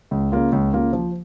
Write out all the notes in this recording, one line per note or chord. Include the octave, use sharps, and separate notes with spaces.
C#2
C#3 A#3 F4
C#2
C#3 A#3 F4
F3